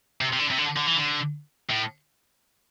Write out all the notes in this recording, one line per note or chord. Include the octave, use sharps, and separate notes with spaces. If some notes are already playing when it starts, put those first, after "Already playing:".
C3
C3
D3
C3
D3
D3
E3
D3
A2